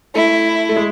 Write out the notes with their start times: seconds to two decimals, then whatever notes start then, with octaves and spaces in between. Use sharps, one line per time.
0.15 A3 E4
0.69 A3
0.76 G#3